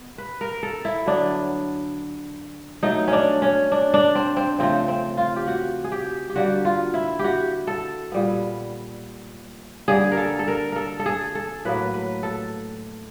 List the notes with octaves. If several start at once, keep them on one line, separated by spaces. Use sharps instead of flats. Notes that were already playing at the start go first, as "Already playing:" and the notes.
Already playing: B3
B4
A#4
A4
E4
D3 F#3 B3 D4
B2 F#3 A3 D#4
C#4
D4
C#4
D4
D4
C4
C4
C#3 F3 A3 C4
C4
F4
G4
F#4
G#4
G4
G4
D3 G3 A#3 F#4
F4
E4
G4
F#4
A4
A#2 G3 B3
D3 G3 A#3 G#4
A#4
A4
A4
A#4
A4 A#4
A4
G#4
A4
A2 F#3 A#3 B4
B4
A4